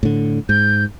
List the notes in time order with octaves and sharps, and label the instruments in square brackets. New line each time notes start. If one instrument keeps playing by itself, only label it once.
[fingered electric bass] A2 D3
[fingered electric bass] G#2 [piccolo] G6